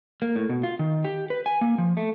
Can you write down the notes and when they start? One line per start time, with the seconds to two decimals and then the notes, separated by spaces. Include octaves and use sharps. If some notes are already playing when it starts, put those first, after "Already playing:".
0.22 A#3
0.36 A2
0.49 B2
0.63 F4
0.79 D#3
1.04 G4
1.30 B4
1.46 G#5
1.61 A#3
1.78 F3
1.97 A3